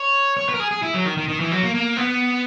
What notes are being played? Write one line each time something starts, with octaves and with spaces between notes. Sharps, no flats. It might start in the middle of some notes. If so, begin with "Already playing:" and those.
Already playing: C#5
C#5
B4
A#4
G#4
G#4
E4
F#3
D#3
D#3
D#3
E3
F#3
A#3
A#3
B3